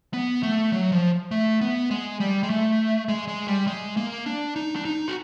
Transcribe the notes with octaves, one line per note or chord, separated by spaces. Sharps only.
B3
A3
F#3
F3
A3
B3
G#3
G3
G#3
A3
G#3
G#3
G3
G#3
A#3
D4
D#4
D4
D#4
F#4